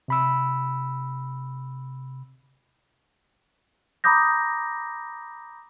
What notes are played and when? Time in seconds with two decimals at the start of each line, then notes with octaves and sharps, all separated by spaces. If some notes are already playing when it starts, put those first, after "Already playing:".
0.08 C3 B5 E6
4.04 A#5 B5 D6 D#6 G6 A#6